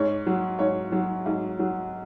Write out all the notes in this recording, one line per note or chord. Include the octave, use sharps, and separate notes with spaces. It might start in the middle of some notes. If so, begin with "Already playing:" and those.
Already playing: G#2 C#5
F#3
G#2 C#5
F#3
G#2
F#3